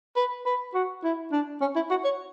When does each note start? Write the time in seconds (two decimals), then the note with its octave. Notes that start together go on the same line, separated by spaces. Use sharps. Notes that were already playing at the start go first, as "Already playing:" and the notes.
0.16 B4
0.46 B4
0.74 F#4
1.04 E4
1.32 D4
1.61 C#4
1.76 E4
1.90 F#4
2.04 C#5